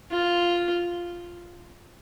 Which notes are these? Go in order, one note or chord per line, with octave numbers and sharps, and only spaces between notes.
F4